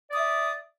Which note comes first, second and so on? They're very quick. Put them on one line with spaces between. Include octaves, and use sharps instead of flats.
D5 D#6 E5